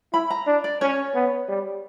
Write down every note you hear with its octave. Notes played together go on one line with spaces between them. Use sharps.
E4 B5
A#5
D4
D5
C#4 C#5
B3
G3